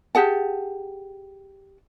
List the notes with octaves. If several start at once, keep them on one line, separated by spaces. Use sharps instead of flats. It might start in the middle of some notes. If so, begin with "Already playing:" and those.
G4 G#4 F#5 A5